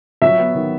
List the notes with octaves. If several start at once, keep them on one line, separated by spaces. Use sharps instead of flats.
F#3 E5
B3
D#3